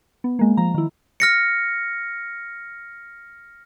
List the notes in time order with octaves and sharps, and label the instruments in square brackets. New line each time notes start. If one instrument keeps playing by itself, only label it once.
[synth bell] B3
G#3 A#3
F3 A#5
D#3 E4
[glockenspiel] F6 A#6 C#7